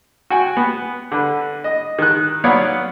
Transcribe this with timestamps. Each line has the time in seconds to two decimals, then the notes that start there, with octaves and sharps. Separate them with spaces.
0.30 F#4 G5 G#5
0.57 B3
1.12 D3 B4
1.64 D#5
1.99 D#3 F#6
2.44 F#3 B3 C#5 D5 F5